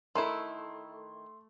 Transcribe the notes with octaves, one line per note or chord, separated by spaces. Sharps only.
D#3 A3 E4 C6